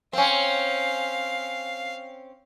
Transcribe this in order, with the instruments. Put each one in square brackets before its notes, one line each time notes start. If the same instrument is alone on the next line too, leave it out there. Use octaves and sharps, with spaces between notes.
[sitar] C4 C#4 [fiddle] F5